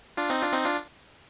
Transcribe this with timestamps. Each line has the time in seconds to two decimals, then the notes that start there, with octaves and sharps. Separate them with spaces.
0.17 D4 F4
0.30 C4 D#4
0.42 D4 F4
0.53 C4 D#4
0.64 D4 F4